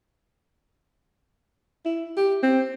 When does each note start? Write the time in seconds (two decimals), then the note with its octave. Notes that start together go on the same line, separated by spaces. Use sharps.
1.85 E4
2.17 G4
2.43 C4